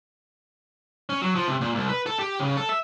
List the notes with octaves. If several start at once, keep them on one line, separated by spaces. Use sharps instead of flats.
C#4
F#3
F3
C3
A#2
C2
B4
A4
G4
C#3
A4
E5